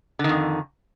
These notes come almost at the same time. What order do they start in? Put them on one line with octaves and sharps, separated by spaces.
D3 D#3 F2